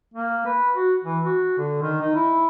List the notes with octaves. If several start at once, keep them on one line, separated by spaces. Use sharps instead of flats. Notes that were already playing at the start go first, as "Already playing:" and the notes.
A#3
B4
F#4
E3
F#4
D3
D#3
D#4
E4